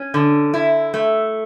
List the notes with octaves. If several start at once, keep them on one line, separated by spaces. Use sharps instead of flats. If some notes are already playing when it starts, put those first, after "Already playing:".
Already playing: C#4
D3
E4
A3